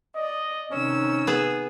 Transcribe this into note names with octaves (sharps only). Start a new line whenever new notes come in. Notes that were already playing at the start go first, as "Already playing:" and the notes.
D5 D#5
C3 D#3 C#4 E6
B3 G#4